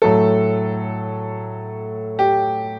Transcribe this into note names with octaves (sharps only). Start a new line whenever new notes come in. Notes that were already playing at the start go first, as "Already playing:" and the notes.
A2 F#3 A3 A4
G4